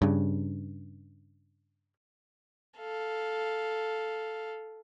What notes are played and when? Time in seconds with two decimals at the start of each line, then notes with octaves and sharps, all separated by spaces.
0.02 G2 C#3
2.78 A4 F5